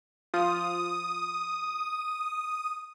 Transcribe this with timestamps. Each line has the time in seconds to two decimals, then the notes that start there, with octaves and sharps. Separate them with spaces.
0.34 F3 F4 D#6